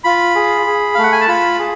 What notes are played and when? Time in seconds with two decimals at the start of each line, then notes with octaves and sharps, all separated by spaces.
0.04 F4 B5
0.36 G#4
0.67 G#4
0.94 F5
0.98 A3 F#5
1.12 G#5
1.21 A5
1.28 F4 B5
1.59 G#4